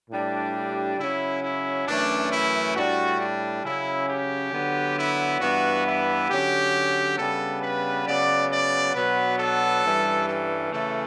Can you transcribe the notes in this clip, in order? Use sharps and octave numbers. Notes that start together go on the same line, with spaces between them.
A2 G3 D4
G4
C#3 F#3 C#4 E4
E4
F#2 E3 A3 C#4 D4
E4
A2 G3 D4 F#4
D4
C#3 F#3 C#4 E4
G4
D3 F#3 B3 D4
E4
G2 E3 B3 D4 F#4
E4
D3 F#3 C#4 G4
C#3 G3 B3 D4 A4
B4
C#3 F#3 B3 D5
D5
B2 F#3 B3 D4 B4
A4
G2 E3 G3 C#4
A4
C#3 E3 A3 C#4 A4